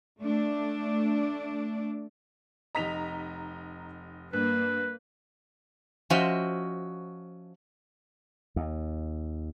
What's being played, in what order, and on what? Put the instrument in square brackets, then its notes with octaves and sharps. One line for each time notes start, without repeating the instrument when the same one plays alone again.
[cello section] A3 D4
[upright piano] F1 D#4 D#5 [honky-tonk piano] A#5 B6 F7
[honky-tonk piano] G2 [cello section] A#3 [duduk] B4
[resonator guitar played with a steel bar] F3 C#4 F#4 C5 D#5 E5
[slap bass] D#2